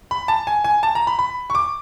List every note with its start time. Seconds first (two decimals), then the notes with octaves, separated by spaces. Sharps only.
0.11 B5
0.28 A5
0.47 G#5
0.64 G#5
0.83 A5
0.95 A#5
1.07 B5
1.19 B5
1.50 C#6
1.55 D6